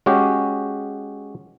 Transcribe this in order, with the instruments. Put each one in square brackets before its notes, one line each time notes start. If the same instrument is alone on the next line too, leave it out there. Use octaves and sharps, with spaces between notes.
[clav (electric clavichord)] G#3 C#4 F#4 G4